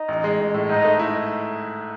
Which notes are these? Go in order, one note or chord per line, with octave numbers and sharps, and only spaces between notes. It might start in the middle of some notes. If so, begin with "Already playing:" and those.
Already playing: D#4
A1
G#3
A1
A2
G#2 D#4
A3
E4